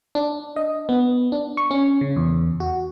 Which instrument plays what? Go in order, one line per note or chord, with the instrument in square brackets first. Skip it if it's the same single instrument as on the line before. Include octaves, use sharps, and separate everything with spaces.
[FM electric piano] D4
D#5
B3
D4
C#6
C#4
C#3
E2
F#4